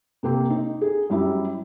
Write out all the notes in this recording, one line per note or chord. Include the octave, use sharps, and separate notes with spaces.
C3 A#3 C4
D#4
G#4
F#2 G3 E4